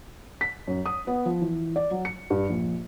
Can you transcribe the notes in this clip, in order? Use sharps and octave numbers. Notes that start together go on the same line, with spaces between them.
B6
F#2
D#6
B3
F3
E3
D5
F#3
C#7
G2
A#1